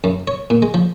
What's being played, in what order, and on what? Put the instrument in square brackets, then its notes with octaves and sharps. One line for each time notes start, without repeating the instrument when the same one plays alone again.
[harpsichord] F#2
C#5
A#2
G#3
F3